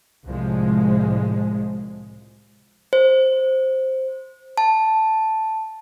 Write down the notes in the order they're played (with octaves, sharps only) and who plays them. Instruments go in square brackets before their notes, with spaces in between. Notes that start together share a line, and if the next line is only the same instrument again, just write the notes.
[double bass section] C2 A2 F3 G#3
[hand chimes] C5
A5